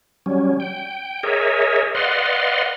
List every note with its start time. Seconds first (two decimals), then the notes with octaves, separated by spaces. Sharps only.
0.26 F#3 G3 C#4
0.60 G5
1.23 G#4 A#4 C#5 D#5 E5
1.95 B4 D5 D#5 F5 F#5 C6